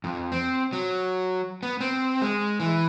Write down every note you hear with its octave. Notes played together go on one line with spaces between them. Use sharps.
F2
C4
F#3
B3
C4
G#3
E3